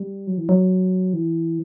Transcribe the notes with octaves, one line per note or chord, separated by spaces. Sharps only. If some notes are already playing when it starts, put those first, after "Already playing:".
Already playing: G3
F#3
E3
F#3
E3